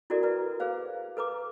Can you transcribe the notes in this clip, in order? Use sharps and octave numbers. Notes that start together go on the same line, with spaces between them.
E4 F#4 A4 A#4 D5
E4 B4 A#5
G#4 B4 C5 F5
A4 B4 A#5 D6